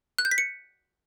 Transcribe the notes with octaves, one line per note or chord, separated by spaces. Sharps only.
F#6
G6
B6
C#7